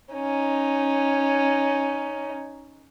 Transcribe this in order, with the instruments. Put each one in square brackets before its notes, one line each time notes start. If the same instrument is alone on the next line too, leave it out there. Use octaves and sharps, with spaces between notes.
[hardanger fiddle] C#4 D#4